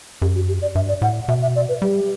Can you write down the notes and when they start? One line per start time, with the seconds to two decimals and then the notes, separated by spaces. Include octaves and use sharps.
0.22 F#2 G4
0.35 F#4
0.48 G4
0.62 D5
0.75 G2 E5
0.88 D5
1.02 A2 F#5
1.28 B2 E5
1.42 E5
1.56 D5
1.69 B4
1.82 G3 G4